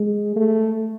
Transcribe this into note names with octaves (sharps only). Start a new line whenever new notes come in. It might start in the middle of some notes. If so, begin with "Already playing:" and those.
Already playing: G#3
A3